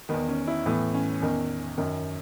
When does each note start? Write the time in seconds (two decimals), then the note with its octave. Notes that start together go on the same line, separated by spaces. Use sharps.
0.09 D#3 B3
0.14 E2
0.29 C#4
0.47 E4
0.66 A2 E3 B3
0.94 C#4
1.22 E2 D#3 C#4
1.78 F#2 D#3